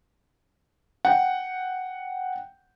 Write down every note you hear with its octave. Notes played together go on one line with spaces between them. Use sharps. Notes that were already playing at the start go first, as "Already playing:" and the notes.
F#5 G5